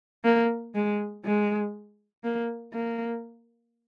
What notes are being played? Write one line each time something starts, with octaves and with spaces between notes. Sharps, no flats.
A#3
G#3
G#3
A#3
A#3